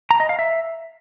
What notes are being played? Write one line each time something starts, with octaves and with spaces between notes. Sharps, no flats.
A#5
D#5
F5
E5